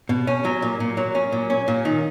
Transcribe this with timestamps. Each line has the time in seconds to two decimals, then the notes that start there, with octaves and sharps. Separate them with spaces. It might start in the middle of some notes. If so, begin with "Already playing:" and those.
0.09 B2
0.27 C#4
0.45 F#3
0.62 A#2
0.80 A#2
0.97 F#3
1.15 C#4
1.32 A#2
1.50 C#4
1.68 A#2
1.85 D#3